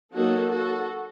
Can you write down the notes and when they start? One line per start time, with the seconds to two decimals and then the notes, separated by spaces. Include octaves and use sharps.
0.13 F#3 A#3 D#4 F#4 A4
0.51 F#4 A4